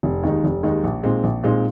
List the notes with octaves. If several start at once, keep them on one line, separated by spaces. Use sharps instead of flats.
F1
D#2 D#3 G#3 D#4
F1
D#2 D#3 G#3 D#4
A#1
A#2 G#3 C4 D#4
A#1
A#2 G#3 C4 D#4